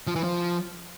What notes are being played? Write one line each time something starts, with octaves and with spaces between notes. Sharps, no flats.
F3
E3
F3